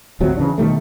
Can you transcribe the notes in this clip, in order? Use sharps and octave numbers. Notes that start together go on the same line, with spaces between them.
D1 G#1 C3 F#3
C#3 E3 D4
B2 D#3 G3 A3